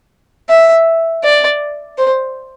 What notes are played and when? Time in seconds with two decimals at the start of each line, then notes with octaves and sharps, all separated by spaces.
0.50 E5
1.24 D5
1.98 C5